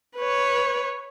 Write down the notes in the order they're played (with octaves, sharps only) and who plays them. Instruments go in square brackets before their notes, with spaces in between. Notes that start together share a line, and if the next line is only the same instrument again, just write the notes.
[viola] B4 C#5